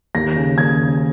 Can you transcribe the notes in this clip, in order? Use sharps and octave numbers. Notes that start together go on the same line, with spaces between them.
D#2 A#6
C#3
D#2 G#6
C#3